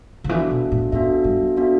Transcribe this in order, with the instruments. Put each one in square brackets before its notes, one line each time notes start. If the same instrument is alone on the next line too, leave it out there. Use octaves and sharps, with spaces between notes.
[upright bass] D3
[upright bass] E3 [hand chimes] B3 D4 F#4 A4 E5
[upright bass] B2
A2
[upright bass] A2 [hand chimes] B3 D4 F#4 A4 E5
[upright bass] G2
[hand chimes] B3 D4 F#4 A4 E5